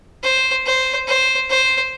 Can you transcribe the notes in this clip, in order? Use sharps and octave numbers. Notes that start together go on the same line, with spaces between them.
C5
C5
C5
C5